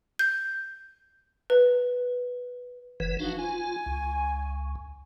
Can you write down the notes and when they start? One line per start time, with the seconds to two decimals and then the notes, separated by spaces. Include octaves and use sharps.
0.19 G6
1.50 B4
3.00 F#1 E3 B4
3.19 F3 D4 D#4 F#4 F5
3.39 F4 G#5
3.86 C#2